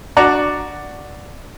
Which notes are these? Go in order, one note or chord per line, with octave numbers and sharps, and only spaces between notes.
D4 F#4 D5 A#5